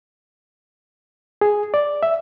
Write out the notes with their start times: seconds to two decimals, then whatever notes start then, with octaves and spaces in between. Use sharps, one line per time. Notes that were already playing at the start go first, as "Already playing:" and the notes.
1.41 G#4
1.74 D5
2.03 E5